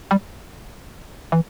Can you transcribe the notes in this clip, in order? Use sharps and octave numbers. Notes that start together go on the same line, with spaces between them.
G3
E3